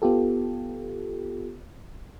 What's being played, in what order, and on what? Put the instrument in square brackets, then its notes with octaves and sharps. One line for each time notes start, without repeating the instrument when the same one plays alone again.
[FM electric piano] B3 F4 G4 A4